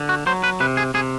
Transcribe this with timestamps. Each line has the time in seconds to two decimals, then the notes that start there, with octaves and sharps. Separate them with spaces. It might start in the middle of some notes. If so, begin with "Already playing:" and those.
Already playing: D3
0.09 F#4
0.26 F#3 C5
0.44 B4
0.60 C3 B4
0.77 G#4
0.94 C3 G#4